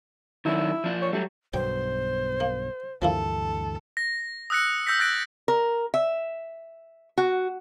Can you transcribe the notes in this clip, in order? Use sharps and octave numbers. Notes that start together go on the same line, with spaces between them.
D#3 F#3 D4 E4
F3 D4
C#5
F#3 G3 A3
B1 G2 B2 C5 C#5 G5
A#3
D2 G2 E3 F3 A#3 E4 A4
A#6
D#6 E6 F#6 A#6 C#7
E6 G6 A#6 B6
E6 F#6 A6 A#6 D7
A#4
E5
F#4